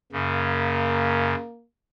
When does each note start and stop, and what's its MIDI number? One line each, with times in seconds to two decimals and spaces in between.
0.12 1.35 42
0.12 1.35 49
0.12 1.65 58